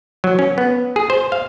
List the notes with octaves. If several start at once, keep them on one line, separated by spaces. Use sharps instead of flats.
F#3
C#4
B3
G#4
C5
F5